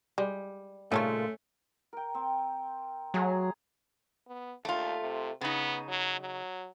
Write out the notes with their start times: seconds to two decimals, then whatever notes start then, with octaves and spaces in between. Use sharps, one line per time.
0.18 G3 G#3
0.92 A#2 C#3 A3 C#4 D#4 F4 A4 C#5
1.93 A#4 G5
2.14 C4
3.14 F#3 A3 G#4 A#5
4.28 B3
4.65 D#2 A3 F4
5.02 C3
5.41 C#3 B3 D#4
5.89 F#3
6.21 F#3